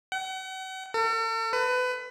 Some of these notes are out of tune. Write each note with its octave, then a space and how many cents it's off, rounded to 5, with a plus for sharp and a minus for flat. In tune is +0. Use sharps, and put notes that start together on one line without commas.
F#5 +40
A4 +45
B4 +25